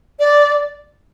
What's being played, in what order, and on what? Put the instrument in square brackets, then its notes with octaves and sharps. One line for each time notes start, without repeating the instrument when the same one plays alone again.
[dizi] D5